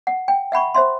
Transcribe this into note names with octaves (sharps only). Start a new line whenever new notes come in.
F#5
G5
E5 F#5 B5 C#6
C5 E5 C6